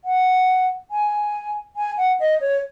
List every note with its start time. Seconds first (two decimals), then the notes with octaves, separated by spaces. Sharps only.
0.05 F#5
0.91 G#5
1.76 G#5
1.97 F#5
2.20 D#5
2.41 C#5